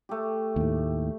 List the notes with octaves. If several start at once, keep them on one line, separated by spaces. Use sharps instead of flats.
A3 G4
D#2 A2